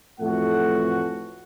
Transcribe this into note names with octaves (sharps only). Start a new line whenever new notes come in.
F2 A2 E3 A3 F#4 F#5